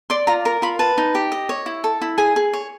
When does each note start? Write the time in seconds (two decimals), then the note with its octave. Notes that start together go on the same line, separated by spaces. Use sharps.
0.10 D5 C6
0.27 F4 A#5
0.45 A#4 A#5
0.62 F4 B5
0.79 B4 A5
0.98 D#4
1.15 G4
1.32 D#5
1.49 C#5
1.66 E4
1.84 A4
2.01 E4
2.18 G#4 G#5
2.36 G#4
2.53 C#5